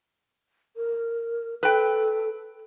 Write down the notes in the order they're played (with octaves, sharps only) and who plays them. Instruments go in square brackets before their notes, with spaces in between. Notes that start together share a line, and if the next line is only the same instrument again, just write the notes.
[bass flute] A#4
[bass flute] A4 [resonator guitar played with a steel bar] B4 G5